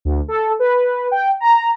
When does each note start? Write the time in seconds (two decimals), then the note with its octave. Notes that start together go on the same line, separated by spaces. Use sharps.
0.05 D2
0.28 A4
0.59 B4
1.11 G5
1.40 A#5